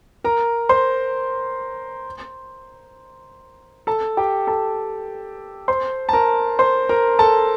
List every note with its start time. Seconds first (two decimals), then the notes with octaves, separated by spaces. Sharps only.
0.24 A#4 A#5
0.69 C5 C6
3.87 A4 A5
4.17 G4 G5
4.47 A4 A5
5.68 C5 C6
6.09 A5
6.13 A#4 A#5
6.59 C5 C6
6.89 A#4 A#5
7.19 A4 A5